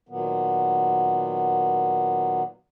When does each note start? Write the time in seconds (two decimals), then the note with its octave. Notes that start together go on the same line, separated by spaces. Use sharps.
0.09 A#2 D#3 F#3 B3